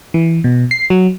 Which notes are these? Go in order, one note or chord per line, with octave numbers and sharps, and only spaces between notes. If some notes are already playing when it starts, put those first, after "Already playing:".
E3
B2
C7
F#3